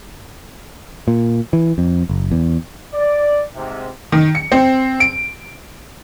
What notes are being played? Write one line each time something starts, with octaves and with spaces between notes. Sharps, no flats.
A#2
E3
F2
F#1
E2
D5
G#2 C3
D#3
C#7
C4
D7